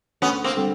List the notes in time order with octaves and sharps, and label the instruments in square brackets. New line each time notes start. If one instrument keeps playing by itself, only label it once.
[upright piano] D2 [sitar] B3 C#4
[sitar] A#3 C4
[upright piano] D3 G3 C4